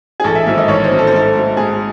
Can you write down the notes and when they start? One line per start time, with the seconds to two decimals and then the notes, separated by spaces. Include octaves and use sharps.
0.20 G#4
0.24 A1 A4
0.35 E5
0.46 G#2 D#3 F#3 C4 E5
0.58 D#5
0.68 A1 C#5
0.84 C5
0.90 G#2 D#3 F#3 C4
0.99 A4
1.07 C5
1.12 G#2 A4
1.35 F#3 A3 C4
1.57 G#2 G#4